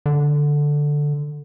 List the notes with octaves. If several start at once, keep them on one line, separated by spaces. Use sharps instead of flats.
D3